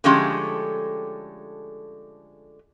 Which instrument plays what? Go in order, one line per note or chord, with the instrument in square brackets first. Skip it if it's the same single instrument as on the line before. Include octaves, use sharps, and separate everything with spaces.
[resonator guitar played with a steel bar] D3 F3 G#3 A3 C#4 G4